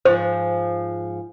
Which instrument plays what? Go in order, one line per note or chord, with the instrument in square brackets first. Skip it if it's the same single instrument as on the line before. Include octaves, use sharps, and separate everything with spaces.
[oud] G#2 F3 [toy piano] C5